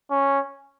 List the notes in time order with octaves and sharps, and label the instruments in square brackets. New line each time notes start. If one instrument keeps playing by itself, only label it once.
[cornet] C#4